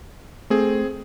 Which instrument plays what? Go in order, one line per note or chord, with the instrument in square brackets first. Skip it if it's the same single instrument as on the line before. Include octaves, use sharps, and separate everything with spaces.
[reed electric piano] A3 [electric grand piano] C4 G#4